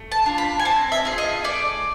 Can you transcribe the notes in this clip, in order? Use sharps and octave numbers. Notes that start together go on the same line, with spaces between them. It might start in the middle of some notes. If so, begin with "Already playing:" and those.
Already playing: A3
A5
D4 F4
B5
G#5
C4 A5
E5
F4 G#4
D#5
A3 D5